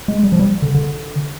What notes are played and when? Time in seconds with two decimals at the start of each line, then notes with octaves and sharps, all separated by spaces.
0.08 G#3
0.23 G3
0.32 F3
0.39 G3
0.62 D3
0.74 D3